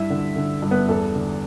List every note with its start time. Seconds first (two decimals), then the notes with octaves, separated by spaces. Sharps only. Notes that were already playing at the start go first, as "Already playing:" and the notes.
Already playing: G2 E4 E5
0.10 D3
0.36 D3
0.62 G2
0.71 B3 B4
0.88 E2 A4
1.15 D3